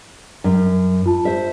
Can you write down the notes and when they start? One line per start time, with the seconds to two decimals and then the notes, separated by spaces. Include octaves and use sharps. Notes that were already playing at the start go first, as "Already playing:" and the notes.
0.44 F#2
1.06 F4 A5
1.25 C5 E5